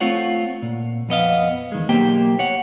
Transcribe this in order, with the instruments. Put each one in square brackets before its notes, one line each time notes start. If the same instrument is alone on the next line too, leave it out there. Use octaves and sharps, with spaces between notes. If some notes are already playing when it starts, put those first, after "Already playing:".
[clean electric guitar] A3 C4 F4 C#5 F#5
A#2
F2 B3 D#5 F5
E2 D#3 G#3
B1 A#3 G4 C5 G5
C#5 F#5